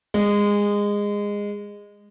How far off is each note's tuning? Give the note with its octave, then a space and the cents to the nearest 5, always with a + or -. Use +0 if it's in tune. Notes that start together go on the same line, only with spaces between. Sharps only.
G#3 -20